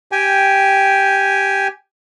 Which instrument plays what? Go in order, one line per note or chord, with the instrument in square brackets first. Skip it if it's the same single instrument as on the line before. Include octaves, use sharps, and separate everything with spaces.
[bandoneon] G4 G5 G#5